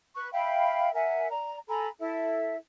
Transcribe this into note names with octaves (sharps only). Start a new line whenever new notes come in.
B4 C#6 F#6
E5 F5 G5 B5
A#4 E5 F#5 G#5
D5 A#5
A4 G#5 A#5 B5
E4 A4 E5